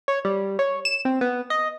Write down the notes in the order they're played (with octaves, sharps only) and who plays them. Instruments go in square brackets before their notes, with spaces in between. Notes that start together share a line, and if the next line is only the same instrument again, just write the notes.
[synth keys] C#5
G3
C#5
E7
C4
B3
D#5